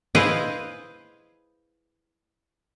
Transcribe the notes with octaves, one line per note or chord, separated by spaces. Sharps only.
E4 G#4 B4 C5 D#5 F5